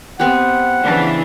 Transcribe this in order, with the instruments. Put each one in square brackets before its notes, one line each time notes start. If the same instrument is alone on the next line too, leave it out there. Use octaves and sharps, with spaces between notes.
[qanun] B3 C4 G4 [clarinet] F#5
[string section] C#3 E3 D4